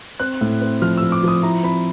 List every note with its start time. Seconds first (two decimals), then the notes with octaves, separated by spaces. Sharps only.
0.20 C4 F#6
0.41 A2
0.61 C4
0.82 F3 F6
0.97 F3 E6
1.12 D6
1.23 F3 D#6
1.43 E4 A#5
1.63 C4 B5